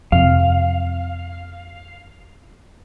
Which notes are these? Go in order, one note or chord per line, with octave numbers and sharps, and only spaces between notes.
F2 C3 F5